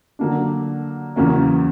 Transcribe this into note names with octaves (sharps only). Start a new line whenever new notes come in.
D3 F#3 A#3 D4
E2 C#3 F#3 A#3 C#4